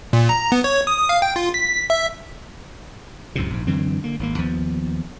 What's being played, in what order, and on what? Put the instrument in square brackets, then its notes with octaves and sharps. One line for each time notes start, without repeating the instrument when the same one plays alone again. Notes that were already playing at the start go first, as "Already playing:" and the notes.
[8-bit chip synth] A#2
A#5
B3
C#5
D#6
F5
G5
F4
B6
E5
[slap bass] C#2 F#2 A2 C3
A#1 G#2
F#2 D3 E3 C4
D3 A#3
G#1 C3 A#3
D#2 F3 B3